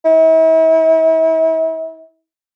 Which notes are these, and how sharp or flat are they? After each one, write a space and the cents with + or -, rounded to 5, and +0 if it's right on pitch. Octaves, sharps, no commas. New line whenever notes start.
E4 -40